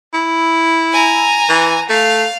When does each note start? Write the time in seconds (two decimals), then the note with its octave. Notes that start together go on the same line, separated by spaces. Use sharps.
0.14 E4
0.92 G#5 A#5
1.49 E3
1.90 A3 F5